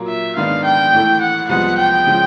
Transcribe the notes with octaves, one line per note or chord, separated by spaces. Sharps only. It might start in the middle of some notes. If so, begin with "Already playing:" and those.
Already playing: A#2 F#3 A#3
E5
G#2 D#3 G#3 B3 D4 F5
G5
A2 E3 A3
F#5
C2 C3 F3 G#3 B3 F#5
G5
C#3 F3 G#3